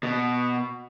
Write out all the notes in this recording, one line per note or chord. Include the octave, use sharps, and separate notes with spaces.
B2